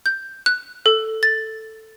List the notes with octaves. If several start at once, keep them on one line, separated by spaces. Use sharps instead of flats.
G6
F#6
A4
A6